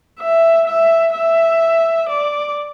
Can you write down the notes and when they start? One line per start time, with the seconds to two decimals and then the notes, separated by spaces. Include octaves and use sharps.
0.20 E5
0.67 E5
1.14 E5
2.09 D5